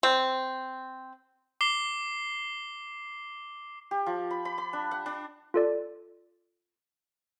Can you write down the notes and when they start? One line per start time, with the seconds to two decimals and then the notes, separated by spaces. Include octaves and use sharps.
0.03 C4
1.61 D6 C7 G7
3.91 G4
4.06 F3
4.31 B5
4.45 B5
4.58 B5
4.73 D4
4.91 F#5
5.06 D4
5.54 F4 A4 D5